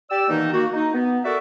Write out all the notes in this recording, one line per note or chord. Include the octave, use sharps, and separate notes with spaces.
G4 D5 E6
B2 D#3 E3 A#3 D#4
A#3 F#4
D#4
B3
F#4 A4 A#4 D5 E5